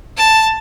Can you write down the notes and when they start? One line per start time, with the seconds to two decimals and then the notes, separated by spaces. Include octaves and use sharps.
0.17 A5